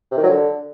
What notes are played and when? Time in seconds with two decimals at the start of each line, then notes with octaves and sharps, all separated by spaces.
0.11 C3
0.17 D#3
0.23 F#3
0.29 D3